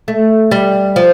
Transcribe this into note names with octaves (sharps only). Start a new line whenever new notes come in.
A3
G3
F3